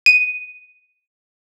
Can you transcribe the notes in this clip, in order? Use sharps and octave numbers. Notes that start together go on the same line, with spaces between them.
D#7